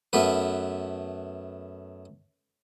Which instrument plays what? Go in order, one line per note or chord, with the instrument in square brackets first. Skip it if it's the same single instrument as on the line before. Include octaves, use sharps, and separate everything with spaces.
[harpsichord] F#2 A3 B3 B4